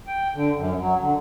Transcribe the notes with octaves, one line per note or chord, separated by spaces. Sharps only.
G5
D3
F#2
F#3
D3